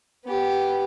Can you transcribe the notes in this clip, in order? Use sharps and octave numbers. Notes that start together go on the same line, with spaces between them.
B3 G4